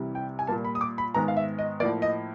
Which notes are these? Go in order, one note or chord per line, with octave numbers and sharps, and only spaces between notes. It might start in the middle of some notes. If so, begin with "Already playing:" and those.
Already playing: C2 C3 E3 G3
G5
G#5
A#2 G3 A#3 A5
B5
D#6
D6
B5
G#2 D#3 G#3 B3 A#5
F5
E5
D#5
A2 F3 A#3 D5
D#5